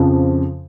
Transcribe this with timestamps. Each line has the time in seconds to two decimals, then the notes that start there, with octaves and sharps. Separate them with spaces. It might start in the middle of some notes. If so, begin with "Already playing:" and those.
Already playing: F2 C#3 F3